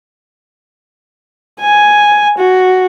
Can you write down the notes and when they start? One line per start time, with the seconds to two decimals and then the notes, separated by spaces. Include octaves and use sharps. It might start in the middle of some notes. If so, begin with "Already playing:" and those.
1.61 G#5
2.39 F#4